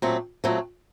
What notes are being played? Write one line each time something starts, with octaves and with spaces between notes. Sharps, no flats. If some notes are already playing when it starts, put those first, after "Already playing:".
A#2 F#3 A3 C4
A#2 F#3 A3 C4